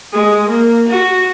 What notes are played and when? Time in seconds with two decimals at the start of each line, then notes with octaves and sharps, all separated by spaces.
0.12 G#3
0.49 A#3
0.89 F#4